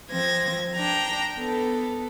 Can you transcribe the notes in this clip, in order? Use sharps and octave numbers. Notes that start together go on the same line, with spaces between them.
F3 C4 G#6 A#6
D4 G5 A#5
B3 A4